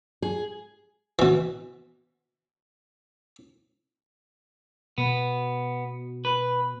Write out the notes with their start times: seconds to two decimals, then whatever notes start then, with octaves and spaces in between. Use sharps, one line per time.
0.22 G#4
1.19 B2 E3
4.98 B2 B3
6.25 B4